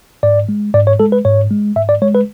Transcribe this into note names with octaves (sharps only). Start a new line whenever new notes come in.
G#2 D5
G#3
G#2 D5
C#5
G#3 A4
B4
G#2 C#5
G#3
G#2 E5
D5
G#3 C#5
B4